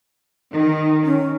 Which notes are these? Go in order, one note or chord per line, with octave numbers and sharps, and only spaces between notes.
D#3
C#4